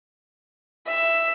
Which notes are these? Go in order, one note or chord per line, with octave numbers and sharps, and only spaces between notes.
E5